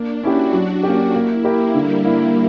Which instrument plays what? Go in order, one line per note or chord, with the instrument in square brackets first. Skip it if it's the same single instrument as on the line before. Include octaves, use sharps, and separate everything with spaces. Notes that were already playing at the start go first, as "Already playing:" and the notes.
Already playing: [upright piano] A#3 [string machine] D4
[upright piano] C#4 E4 G4 [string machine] F#4
[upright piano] F#3
A#3 C#4 G4
[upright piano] A#3 [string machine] E4
[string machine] A#3 [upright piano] E4 G4 A#4
[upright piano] D3 [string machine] G3
[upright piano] A#3 E4